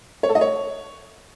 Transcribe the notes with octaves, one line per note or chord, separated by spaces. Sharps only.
C#5
A4
D#5
C#5